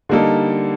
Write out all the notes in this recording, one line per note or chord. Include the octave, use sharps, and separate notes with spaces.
D3 G3 A#3 D#4 A4